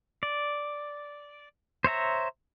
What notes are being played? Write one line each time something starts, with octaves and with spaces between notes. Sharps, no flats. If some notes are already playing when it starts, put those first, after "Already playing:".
D5
C5 C#5 E5 A#5